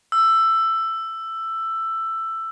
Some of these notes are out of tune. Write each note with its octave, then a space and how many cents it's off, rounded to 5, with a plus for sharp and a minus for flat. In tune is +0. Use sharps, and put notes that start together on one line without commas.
E6 +10